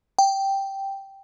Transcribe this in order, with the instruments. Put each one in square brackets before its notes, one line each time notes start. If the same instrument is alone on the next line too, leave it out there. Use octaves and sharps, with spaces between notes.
[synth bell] G5